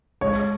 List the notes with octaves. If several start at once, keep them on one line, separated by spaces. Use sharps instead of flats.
G#3 C#5